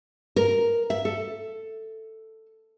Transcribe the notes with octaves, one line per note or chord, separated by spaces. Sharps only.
A#4
E5
A4